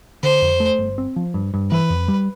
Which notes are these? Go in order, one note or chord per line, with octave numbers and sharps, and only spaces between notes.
D3 C5
F2
A3
G1
C4
F3
G2
G2
E3 B4
F2
G3